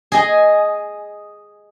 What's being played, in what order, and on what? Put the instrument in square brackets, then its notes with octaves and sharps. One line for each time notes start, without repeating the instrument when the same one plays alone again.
[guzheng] G#4 D#5 G#5